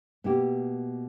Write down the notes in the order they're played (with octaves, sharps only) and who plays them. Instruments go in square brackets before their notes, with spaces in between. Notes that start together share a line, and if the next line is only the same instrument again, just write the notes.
[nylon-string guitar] B2 A#3 E4 G4